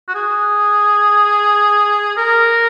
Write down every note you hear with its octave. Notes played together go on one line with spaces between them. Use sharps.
F#4
G#4
A#4